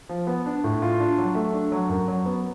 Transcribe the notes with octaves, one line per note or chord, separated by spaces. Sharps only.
F3
B3
D4
A2
F4
D4
F#3
A3
D4
F#3
F#2
F#3
B3